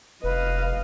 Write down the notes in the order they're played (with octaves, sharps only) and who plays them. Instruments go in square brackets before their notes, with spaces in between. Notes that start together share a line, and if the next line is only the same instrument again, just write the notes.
[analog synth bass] F1 [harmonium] B4 [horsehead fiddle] D#5 F5